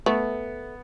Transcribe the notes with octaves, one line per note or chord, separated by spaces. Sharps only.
A3 B3